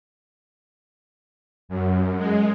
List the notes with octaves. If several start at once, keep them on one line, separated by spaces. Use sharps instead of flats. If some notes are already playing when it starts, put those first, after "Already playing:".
F#2
G#3